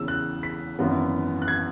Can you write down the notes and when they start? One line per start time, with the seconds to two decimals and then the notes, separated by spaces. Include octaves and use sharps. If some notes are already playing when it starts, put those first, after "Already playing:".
Already playing: E2 C#3 E3 C#4 E6
0.08 F#6
0.43 B6
0.79 G#1 F#2 E3 B3
1.42 F#6
1.48 G#6